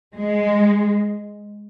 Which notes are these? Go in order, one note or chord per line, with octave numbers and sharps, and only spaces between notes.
G#3